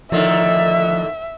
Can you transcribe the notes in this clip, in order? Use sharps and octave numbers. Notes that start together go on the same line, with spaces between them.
A2 D3 D#3 F3 E5